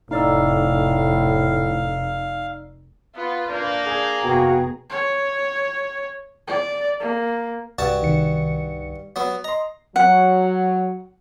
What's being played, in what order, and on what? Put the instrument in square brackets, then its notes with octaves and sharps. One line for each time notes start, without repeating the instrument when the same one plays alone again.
[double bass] F1 [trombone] A2 [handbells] D#4 D5 E6 [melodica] F5
[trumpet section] B3 [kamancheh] F4 B4
[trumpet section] A#3 [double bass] D4 [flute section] G6
[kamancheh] G#4 A#5
[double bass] F1 B3 [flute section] F#4 F5 G5
[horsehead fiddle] C#5
D5
A#3
[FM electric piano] C2 [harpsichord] G2 F#4 A5
[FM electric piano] C2 D#3 C#7
[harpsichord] F#3 B3
[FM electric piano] D#5 C6 [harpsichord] A#5
[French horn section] F#3 [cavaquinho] F#5